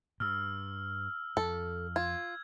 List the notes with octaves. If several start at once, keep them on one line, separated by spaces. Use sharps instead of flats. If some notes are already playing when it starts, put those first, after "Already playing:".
G2 E6 F6
F2 A4
F4 G#6